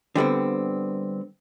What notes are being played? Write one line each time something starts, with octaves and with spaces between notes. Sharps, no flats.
D3 G3 B3 C4